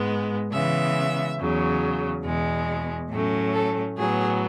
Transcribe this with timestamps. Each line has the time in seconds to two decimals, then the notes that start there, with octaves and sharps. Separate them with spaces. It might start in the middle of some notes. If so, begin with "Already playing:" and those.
Already playing: G#2 G#3 B3
0.52 C#3 E3 G#3 B3 E5
1.39 E2 C#3 F#3
2.24 E2 B2 G#3
3.10 A2 F#3 A3 C#4
3.53 A4
3.97 A2 F#3 B3 G#4